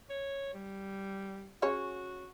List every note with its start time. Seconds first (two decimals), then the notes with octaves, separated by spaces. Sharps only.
0.10 C#5
0.54 G3
1.62 C#4 F#4 G#4 C#5